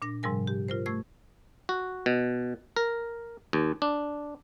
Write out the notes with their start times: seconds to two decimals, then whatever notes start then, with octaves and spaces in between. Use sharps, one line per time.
0.02 A#2 D4 A#6
0.23 G#2 C3 F3 G3 A#4 G#5
0.47 G4
0.68 F4 A#4 C5
0.86 A3 C#6 E6 G#6
1.69 F#4
2.06 B2
2.76 A#4
3.53 D#2
3.82 D4